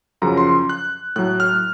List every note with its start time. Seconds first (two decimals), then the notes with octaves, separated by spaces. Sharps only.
0.22 F#2 C#3 F3 A#5
0.37 C6
0.69 F#6
1.16 A2 F#3 F#6
1.40 F6